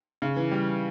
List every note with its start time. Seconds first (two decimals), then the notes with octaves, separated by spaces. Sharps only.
0.22 C#3
0.36 E3
0.51 G3